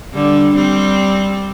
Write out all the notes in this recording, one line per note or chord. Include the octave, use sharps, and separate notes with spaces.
D3 G3
G3 C4